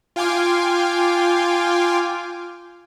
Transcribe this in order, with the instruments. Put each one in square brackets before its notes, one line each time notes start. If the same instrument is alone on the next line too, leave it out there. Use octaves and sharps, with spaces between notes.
[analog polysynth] F4 F5 G5 G#5 C6 D6